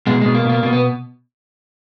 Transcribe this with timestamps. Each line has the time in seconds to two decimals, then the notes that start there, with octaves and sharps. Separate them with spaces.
0.07 B2 G#3
0.21 B2 G#3
0.35 A#3
0.45 B2 A#3
0.63 B2 A#3
0.73 B3